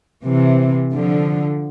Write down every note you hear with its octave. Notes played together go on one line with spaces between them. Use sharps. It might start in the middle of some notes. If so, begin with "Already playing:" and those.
C3 E3
D3 F3